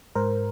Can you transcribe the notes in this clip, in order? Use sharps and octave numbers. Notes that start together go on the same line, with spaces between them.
G#2 A#4 C5